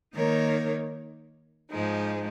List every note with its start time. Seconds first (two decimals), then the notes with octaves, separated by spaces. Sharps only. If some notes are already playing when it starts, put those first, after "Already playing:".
0.13 D#3 A#3 D#4 A#4 C#5
1.71 G#2 F3 G#3 D#4